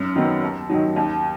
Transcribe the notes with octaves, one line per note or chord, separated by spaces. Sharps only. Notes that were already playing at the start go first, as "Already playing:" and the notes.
Already playing: F#2
D#3 F#3 B3
D#2
D#3 F#3
D#2